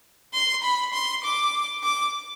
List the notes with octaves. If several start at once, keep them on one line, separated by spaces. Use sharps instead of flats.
C6
B5
C6
D6
D6